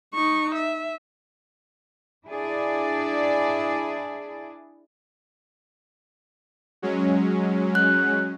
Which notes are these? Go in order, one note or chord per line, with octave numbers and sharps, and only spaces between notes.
D#4 C#6
E5
D4 E4 G#4 D5
F#3 G#3 C#4
F#6